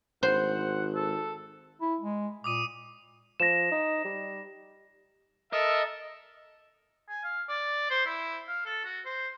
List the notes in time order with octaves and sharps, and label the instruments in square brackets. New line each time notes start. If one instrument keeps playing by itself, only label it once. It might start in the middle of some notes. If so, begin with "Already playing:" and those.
[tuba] G#1 [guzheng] C5 [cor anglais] F#5
[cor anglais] A4
[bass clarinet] E4
G#3
[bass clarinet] A#2 [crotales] D6 D#6 D#7
[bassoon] F3 [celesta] A#6 E7
[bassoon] D#4
G3
[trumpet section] A4 A#4 E5 [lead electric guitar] D#5
[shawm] G#5
F5
D5
C5
E4
F5
A4
F#4
C5